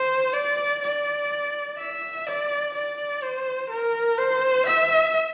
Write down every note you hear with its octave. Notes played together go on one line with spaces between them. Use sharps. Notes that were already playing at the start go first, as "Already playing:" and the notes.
Already playing: C5
D5
D5
E5
D5
D5
C5
A#4
C5
E5